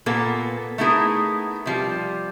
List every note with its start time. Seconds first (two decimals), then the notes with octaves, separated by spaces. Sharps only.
0.06 A#2 A#3 B3 A4
0.78 A3 B3 D#4 E4 G#4 A#4
1.66 C3 F3 G3